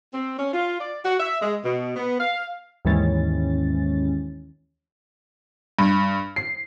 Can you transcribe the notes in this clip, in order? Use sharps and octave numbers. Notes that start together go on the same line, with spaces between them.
C4
C#4
F4
D5
F#4
E5
G#3
B2
B3
F5
D#2 G#2 E3 C#4 A6
G2
C7